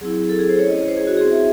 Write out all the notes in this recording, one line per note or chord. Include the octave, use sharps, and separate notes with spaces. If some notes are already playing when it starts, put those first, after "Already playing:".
F#3 C4 E4 G#4
A4
G#4
C5
A3 C#4 E4 C#5
D#5
C#5
C5
G#4
F#4
C4 E4 G#4
E5